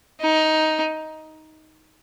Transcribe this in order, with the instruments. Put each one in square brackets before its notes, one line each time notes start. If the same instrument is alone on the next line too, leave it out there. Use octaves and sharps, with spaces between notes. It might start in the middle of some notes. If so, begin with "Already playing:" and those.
[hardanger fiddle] D#4